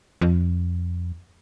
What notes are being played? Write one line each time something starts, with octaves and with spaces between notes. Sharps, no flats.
F2